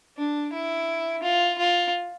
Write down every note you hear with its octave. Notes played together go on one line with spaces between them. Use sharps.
D4
E4
F4
F4